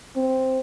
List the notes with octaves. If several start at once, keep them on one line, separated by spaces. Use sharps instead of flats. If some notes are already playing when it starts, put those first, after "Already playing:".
C4